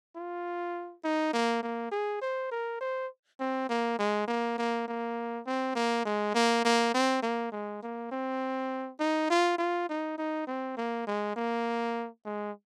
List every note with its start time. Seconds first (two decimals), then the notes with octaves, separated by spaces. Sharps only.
0.16 F4
1.04 D#4
1.33 A#3
1.63 A#3
1.91 G#4
2.21 C5
2.51 A#4
2.81 C5
3.40 C4
3.69 A#3
3.99 G#3
4.28 A#3
4.58 A#3
4.88 A#3
5.46 C4
5.75 A#3
6.05 G#3
6.35 A#3
6.65 A#3
6.94 C4
7.22 A#3
7.52 G#3
7.83 A#3
8.11 C4
8.99 D#4
9.30 F4
9.58 F4
9.89 D#4
10.18 D#4
10.47 C4
10.77 A#3
11.07 G#3
11.36 A#3
12.25 G#3